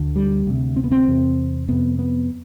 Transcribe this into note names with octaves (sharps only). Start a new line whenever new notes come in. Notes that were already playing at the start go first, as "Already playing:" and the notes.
Already playing: D2 D3
G3
D2 C3
C4
B3
C4
E2 C3
F2 C3 B3
B3